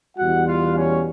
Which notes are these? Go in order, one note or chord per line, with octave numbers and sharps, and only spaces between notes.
E2 B2 G3 F#4 F#5
F4 F5
C#4 C#5